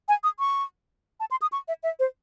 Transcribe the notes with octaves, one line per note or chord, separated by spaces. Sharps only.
G#5
D#6
C#6
A5
C6
D#6
C#6
E5
E5
C5